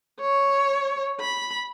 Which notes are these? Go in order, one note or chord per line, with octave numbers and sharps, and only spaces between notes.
C#5
B5